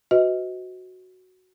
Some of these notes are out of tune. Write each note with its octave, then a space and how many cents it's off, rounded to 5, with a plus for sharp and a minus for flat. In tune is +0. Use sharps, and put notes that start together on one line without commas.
F#4 +0 B4 +30 D#5 +25